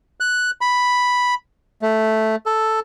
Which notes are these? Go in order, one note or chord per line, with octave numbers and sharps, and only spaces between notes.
F#6
B5
A3
A4